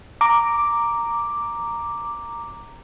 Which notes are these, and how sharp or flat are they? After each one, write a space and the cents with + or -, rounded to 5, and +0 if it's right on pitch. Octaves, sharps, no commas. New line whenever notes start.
A#5 -5 D6 +0